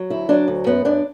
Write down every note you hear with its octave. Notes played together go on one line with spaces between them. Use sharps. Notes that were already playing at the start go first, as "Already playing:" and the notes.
Already playing: F#3
D2 E4
F#3 D4
D2
F#2 B3
F#2 D4